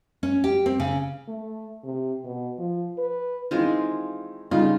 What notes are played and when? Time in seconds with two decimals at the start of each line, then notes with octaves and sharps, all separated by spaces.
0.23 C#4
0.44 G4
0.66 C4
0.80 C#3
1.28 A3
1.84 C3
2.24 B2
2.58 F3
2.98 B4
3.51 D#3 E3 G#3 C4 F4
4.51 G2 C#3 D#4 F4